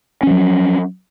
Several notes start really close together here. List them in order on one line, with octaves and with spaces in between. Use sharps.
C#4 F3 F#3